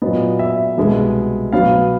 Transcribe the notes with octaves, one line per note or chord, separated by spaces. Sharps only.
A#2 F#3 B3 D#5
E5
C2 B2 G#3 B3
B2 F#3 B3 F5